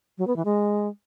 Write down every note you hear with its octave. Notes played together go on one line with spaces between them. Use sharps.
F#3
B3
E3
G#3